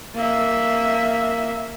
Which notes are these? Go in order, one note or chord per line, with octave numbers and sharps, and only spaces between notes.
A#3 E5